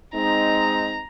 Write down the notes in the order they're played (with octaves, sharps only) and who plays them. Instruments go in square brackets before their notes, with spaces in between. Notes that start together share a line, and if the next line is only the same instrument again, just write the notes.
[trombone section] G#3 C4 D#4 [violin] A#5